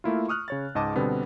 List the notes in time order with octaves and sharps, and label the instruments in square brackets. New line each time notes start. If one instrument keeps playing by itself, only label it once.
[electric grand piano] A3 A#3 E4 F4
C#6 D#6 F6 F#6
C#3 C#5 A6
C#2 G#2 D#5 A5 D6 D#6
B2 D3 G3 B3 C4